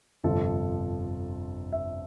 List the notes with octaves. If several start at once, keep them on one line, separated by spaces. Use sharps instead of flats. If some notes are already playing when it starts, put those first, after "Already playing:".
G1 F2 C3 F3 A4
E5